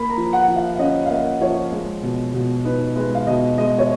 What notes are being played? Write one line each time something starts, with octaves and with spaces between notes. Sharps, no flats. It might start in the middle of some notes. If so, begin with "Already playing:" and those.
Already playing: A#3 B5
A#5
F3
F#5
F3
F5
F5
C#4 D#5
F5
A#3 D#5
F3 C#5
G#3
B2
B2
D#4 B4
G#3 B4
F5
B2 D#5
G#3 D#5
C#5